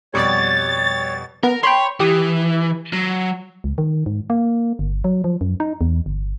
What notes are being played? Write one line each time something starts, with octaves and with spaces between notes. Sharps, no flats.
F2 B2 G3 C#5 D5 A6
B3 A#4
C#5 G5 B5 C6
E3 G4 D#6
F#3
C#2
D#3
G#2
A#3
G1
F#3
F3
F#2
D#4
E2
G1